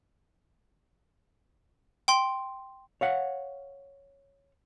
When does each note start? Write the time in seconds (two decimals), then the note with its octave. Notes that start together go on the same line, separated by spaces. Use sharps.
2.08 G5 C6
3.01 C#5 F5 F#5